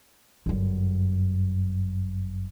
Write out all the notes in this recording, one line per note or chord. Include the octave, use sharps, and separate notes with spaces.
G1 F#2